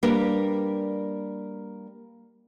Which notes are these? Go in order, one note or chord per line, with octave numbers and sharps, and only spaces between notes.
G3 A#3 D4 G4 A#4 B4